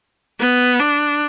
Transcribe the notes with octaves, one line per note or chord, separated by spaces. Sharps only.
B3
D4